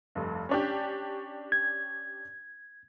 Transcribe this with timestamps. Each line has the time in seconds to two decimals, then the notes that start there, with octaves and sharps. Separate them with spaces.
0.15 F1 G2
0.49 C#4 D4 G4
1.52 G#6